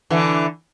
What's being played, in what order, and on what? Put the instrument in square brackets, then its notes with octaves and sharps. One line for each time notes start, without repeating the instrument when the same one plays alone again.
[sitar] D3 E3